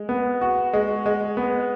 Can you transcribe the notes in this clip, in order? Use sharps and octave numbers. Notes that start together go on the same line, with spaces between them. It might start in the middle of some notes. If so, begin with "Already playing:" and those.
Already playing: G#3
B3
F#4
G#3
G#3
B3